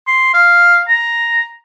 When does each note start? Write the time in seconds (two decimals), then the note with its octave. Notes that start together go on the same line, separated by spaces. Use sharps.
0.07 C6
0.34 F5
0.88 A#5